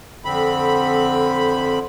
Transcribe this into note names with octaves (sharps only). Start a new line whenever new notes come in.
F2 D3 C4 B5